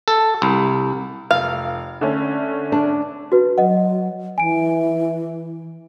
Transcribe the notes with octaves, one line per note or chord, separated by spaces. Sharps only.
A4
C2
F1 F5
D3 A3 C#4
D4
F#4 B4
F#3 D#5 F#5
E3 G#5 D7